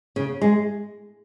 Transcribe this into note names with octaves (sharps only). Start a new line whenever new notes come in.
C#3
G#3